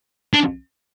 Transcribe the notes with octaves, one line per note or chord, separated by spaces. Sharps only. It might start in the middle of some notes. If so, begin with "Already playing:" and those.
D4